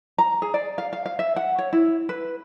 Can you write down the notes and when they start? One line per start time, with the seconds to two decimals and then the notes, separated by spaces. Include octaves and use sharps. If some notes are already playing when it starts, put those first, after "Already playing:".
0.18 A#5
0.42 G#4
0.54 D5
0.78 F5
0.93 F5
1.06 F5
1.19 E5
1.36 F#5
1.59 C#5
1.73 E4
2.09 B4